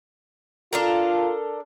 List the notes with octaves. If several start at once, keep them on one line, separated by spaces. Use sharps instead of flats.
D4 F4 A4 A#4